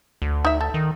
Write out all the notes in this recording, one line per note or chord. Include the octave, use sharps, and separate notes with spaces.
D2
D#4 E5
A4
D#3